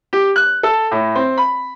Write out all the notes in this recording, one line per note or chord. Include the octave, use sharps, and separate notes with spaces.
G4
F#6
A4
A2
C4
B5